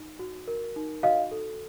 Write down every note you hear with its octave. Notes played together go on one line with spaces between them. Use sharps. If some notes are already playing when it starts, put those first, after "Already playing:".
Already playing: D#4
F#4
A#4
D#4
F#4 D#5 F5
A4